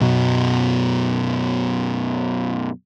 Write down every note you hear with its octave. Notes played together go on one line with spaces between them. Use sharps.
F#2 B2 F#3